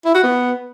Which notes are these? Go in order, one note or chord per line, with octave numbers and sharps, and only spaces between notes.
E4
F#4
B3